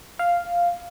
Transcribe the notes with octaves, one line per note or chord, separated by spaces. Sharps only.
F5